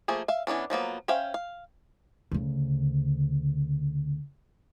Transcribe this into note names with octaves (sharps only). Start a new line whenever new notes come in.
F3 A3 A#3 G#4
E5 F5
E3 B3 C#4 D4
F3 F#3 A#3 B3
C#4 C5 E5 F5 G5
F5
D2 C#3